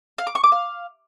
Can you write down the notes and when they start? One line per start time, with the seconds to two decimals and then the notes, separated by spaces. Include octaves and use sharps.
0.18 F5
0.27 D6
0.35 C#6
0.44 D6
0.52 F5